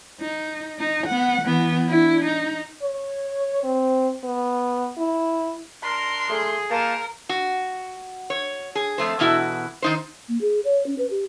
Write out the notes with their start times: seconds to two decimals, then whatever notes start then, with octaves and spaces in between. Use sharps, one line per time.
0.21 D#4
0.79 D#4
1.07 B3 F#5
1.42 E3 B3
1.88 D4 E4
2.25 D#4
2.82 C#5
3.63 C4
4.24 B3
4.97 E4
5.83 D4 A#4 C6
6.30 A3 G#4
6.70 A#3 D#4 F4 A#4 A5
7.29 F#4
8.30 C#5
8.75 G#4
8.98 F2 A3 C5
9.19 E2 B2 E4 F#4
9.82 D#3 D#4 C5
10.28 A#3
10.41 G#4
10.65 C#5
10.86 C#4
10.98 B4
11.10 G4